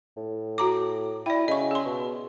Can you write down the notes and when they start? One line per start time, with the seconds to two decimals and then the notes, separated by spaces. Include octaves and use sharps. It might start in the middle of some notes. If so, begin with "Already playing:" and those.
0.17 A2
0.58 F#4 A#5 D6
1.26 E4 D5 G5
1.48 C#3 D#5 C#6
1.71 G#4 C6
1.85 B2